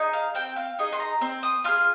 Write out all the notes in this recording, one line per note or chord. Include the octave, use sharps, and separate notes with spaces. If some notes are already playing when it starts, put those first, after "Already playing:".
Already playing: D#4 G#4
F5
C4 G5
F5
D#4 G#4 D#5
C6
A#5
C4
D#6
F4 G#4 F6